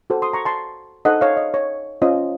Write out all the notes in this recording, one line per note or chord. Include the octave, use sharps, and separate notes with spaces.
F#4 A4 C5
C6 D#6
A#5 C#6
A5 C6
D#4 A4 C5 D#5 F#5
C#5 F5
D#5
C#5
C#4 F4 C5 D#5